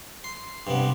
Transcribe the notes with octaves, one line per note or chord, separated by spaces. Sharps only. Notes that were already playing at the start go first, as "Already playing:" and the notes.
C6
G2 C3 B3